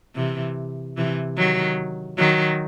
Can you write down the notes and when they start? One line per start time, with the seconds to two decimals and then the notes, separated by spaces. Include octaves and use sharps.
0.15 C3 E3
0.97 C3 E3
1.37 D#3 F#3
2.18 D#3 F#3